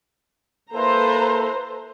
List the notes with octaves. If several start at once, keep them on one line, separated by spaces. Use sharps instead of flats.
A#3 E4 A4 B4 C5 A#5